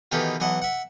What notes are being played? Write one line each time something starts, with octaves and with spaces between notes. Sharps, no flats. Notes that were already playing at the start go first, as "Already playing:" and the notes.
B2 D#3 E3 F4 G4 A4
B1 E3 D#5 F#5 A5
E5 F#5